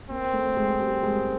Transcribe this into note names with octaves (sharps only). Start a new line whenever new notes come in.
A#3 C4
A3
G#3
G3
G#3